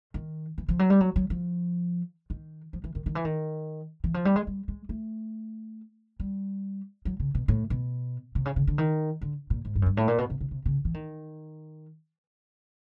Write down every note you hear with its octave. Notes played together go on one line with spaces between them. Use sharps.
D#3
E3
F3
F#3
G3
F#3
F#3
F3
D#3
F3
E3
D#3
D#3
E3
D#3
E3
F3
G3
G#3
G3
G#3
A3
G3
F#3
C#3
B2
A2
B2
C3
C#3
C#3
D3
D#3
D3
A#2
G#2
G2
F#2
G2
A2
A#2
B2
C3
C3
C3
C#3
E3
D#3